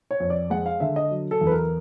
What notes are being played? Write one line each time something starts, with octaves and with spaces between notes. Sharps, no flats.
C#5
F2
D5
G#3 F#5
F5
D3 E5
D#5
F#3
A4
E2
B4
A#4